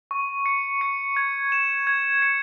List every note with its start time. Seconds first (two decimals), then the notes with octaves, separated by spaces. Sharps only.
0.11 C#6
0.46 C#7
0.81 C#7
1.17 G#6
1.52 E7
1.87 G#6
2.22 C#7